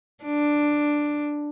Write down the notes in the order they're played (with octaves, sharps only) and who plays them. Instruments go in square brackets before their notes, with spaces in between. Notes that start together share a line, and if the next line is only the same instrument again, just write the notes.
[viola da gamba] D4